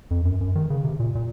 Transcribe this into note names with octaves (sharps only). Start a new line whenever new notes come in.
F2
F#2
F#2
D#3
C#3
C3
A#2
A#2